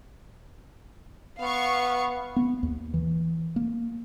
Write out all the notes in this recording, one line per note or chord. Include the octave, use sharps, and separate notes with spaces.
B3 F5 C#6
B3
D#2
E3
A#3